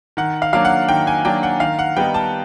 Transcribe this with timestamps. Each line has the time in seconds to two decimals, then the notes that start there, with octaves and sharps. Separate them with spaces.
0.17 D#3 F#5
0.42 F5
0.53 F#3 A#3 D4 F5
0.65 F#5
0.89 D#3 G5
1.07 G#5
1.25 F#3 A#3 D4 G5
1.43 F#5
1.60 D#3 F5
1.79 F#5
1.97 G3 B3 D#4 G5
2.14 A5